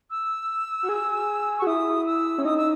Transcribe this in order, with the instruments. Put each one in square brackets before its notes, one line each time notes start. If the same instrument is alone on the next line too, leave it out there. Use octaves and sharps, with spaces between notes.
[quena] E6
[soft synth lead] F#4
G#4
[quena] C#6
[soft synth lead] F#4
[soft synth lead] E4 [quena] D#6
[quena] E6
[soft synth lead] C#4
[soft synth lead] D#4 [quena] D#6
[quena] E6